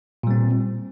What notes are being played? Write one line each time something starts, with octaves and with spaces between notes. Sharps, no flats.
A#2 G3 C4